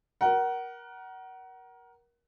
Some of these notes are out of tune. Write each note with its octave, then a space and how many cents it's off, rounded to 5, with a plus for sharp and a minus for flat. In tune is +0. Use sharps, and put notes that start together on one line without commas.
A#4 +25 F#5 +25